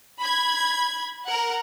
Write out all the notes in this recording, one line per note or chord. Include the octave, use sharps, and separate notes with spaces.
B5 G#6
A#4 F#5